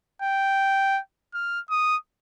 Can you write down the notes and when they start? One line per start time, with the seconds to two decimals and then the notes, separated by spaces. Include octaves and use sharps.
0.22 G5
1.34 F6
1.70 D#6